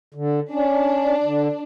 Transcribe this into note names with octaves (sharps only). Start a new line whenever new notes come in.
D3
C#4 D4
D3